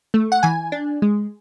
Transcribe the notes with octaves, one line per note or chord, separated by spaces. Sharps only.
A3
F#5
E3 G#5
D4
G#3